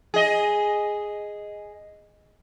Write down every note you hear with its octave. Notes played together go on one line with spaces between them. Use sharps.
G#4 D#5